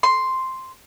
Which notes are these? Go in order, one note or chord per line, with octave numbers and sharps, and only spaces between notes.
C6